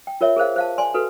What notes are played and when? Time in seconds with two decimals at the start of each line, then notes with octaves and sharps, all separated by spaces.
0.07 G5
0.21 F4 A#4 C#5 E5
0.36 G#4 A#4 C5 F5
0.56 C5 F5 A5
0.78 D5 G#5 C6
0.94 F#4 A4 B4